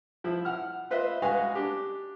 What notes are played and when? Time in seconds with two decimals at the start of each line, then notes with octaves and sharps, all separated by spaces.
0.24 F3 E4
0.45 F#5 F6
0.90 F4 B4 C5 D#5 E5
1.22 G#3 F#4 B4 F5 G#5
1.55 D4 G4